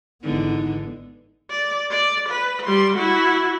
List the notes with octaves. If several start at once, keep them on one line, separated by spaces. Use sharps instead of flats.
G#1 D3 E3 G#3 B3 D#4
D5
D5
B4
G3 C6
E4 F#4